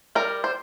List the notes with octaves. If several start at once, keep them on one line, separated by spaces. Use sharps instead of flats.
G3 A#4
C5